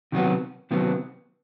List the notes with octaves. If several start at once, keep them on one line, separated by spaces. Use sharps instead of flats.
C3 D#3 F#3 B3
C3 D#3 F#3 B3